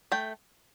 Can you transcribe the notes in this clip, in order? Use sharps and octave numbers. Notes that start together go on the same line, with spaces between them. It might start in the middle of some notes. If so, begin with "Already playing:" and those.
A3 G5